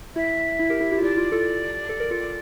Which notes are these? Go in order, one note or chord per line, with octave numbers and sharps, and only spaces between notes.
E4 E5
E4
G4 A#4
E4 G4
E4 G4
F4
E4 G4 D5
F4
F4 A4
A4
A#4
F4 A4